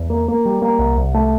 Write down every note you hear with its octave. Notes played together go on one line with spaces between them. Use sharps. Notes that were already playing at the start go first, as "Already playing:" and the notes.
Already playing: E2
A#3
A#3
G3
A#3
C2
C2
A3